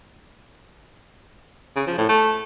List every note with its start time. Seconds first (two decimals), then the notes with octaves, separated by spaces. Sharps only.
1.76 C#3
1.87 F3
1.98 A2
2.09 A3